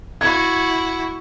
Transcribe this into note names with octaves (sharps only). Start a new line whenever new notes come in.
E4 F#4 G#6